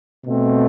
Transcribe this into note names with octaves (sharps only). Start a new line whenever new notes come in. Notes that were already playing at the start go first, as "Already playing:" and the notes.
B2 A3 C4